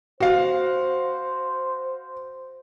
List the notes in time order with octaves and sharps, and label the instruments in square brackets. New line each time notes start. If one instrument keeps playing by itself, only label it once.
[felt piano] F#4 F5 [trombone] C5